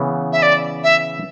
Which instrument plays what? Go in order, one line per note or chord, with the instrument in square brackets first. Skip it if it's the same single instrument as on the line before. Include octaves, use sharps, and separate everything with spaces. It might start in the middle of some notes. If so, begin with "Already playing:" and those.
Already playing: [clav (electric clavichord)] C#3 E3 B3
[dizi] E5
D5
E5